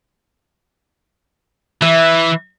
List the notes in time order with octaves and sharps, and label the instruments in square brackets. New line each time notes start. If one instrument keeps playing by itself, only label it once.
[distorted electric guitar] E3 [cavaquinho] E5